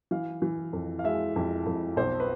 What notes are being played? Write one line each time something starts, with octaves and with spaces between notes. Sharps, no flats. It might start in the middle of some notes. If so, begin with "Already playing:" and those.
E3 F5
E3
F2
F5
G#3 E5
F2
F2
B1 C5
B4